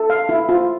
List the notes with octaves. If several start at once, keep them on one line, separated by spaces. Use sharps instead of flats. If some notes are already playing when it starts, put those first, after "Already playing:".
Already playing: A4
F5
E4
F4